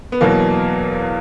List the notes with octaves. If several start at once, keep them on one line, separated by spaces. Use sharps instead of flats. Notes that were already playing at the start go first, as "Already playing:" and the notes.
B3
E2 B2 F#3 A#3